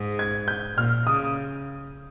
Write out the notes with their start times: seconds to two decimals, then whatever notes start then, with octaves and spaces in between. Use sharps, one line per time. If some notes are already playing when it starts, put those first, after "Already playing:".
Already playing: G#2
0.19 G#6
0.48 G6
0.77 A#2 F6
1.06 C#3 D#6